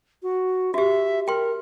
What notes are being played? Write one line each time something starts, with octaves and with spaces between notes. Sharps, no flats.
F#4
F#4 G4 E5
A#4 G5 C6